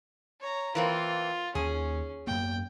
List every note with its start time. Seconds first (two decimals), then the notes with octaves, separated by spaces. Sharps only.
0.41 C#5 A#5
0.75 E3 A#3 C4 F4
1.55 D#2 D#3 C#4 G#4
2.27 F#2 A#3 B3 G5